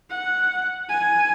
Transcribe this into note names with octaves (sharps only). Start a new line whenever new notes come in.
F#5
G#5